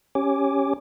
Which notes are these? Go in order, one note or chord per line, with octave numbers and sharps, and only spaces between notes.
C#4 G4 C#5 G#5 D6